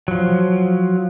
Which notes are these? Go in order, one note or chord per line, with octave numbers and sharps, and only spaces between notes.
F3 F#3